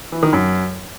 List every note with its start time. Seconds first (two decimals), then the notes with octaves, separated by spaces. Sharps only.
0.12 E3
0.23 D#3
0.33 F#2